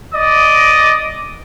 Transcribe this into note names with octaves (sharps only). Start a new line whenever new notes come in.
D5 D#5 D6 D#6